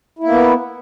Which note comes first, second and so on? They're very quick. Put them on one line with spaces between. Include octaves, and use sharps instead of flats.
E4 A#3 B3